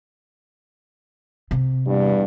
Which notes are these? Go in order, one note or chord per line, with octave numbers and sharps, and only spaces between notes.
C3
E2 G2 G3